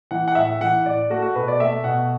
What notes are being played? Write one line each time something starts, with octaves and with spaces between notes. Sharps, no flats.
E3 F#5
F#5
A2 E5
E3 F#5
A2 D5
A3 F#4
F#4
B2 B4
D5
A3 E5
B2 F#5